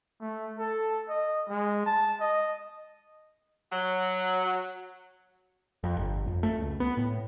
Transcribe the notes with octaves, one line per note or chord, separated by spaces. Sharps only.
A3
A4
D#5
G#3
A5
D#5
F#3
F2
G1
F2
A3
C#2
B3
A2